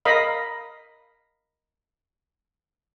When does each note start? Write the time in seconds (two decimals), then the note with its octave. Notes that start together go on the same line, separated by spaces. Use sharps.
0.05 A#4 D#5 F5 B5